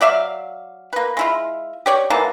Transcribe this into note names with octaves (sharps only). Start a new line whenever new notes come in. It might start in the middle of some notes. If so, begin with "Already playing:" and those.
F#3 D5 E5 F5
A#3 B4
G#3 E4 F4
G4 C#5 D5
E3 F#3 A#3 A5